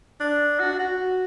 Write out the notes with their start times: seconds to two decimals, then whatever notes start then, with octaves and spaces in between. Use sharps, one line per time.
0.20 D4
0.60 F#4
0.79 F#4